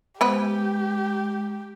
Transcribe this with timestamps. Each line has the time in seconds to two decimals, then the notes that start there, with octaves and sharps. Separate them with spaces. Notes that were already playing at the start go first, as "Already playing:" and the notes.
0.21 G#3 B3 G4 B4 C5